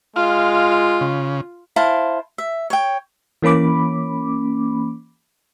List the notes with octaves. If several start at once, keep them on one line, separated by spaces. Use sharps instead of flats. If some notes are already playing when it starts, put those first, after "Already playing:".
G#3 F4 F5
C#3
E4 C5 F5 A5
E5
C#5 G5
E3 A#3 C#4 B5 D6